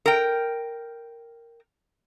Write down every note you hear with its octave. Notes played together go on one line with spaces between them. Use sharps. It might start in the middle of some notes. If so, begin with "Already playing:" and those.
A#4 G5